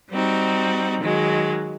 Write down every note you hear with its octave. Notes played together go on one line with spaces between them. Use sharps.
G3 C4 D#4 F#4
D#3 F#3 G#3